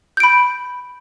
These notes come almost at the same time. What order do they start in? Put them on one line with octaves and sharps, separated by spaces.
G6 D7 B5